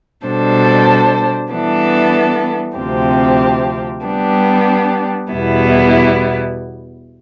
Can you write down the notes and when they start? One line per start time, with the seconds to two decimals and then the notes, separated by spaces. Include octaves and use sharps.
0.25 B2 G3 D4 A4 C5
1.52 E3 G3 B3 D4 A4
2.79 D2 C3 F3 C4 G4
4.06 G3 B3 D4 G4
5.32 E2 B2 G3 B3 E4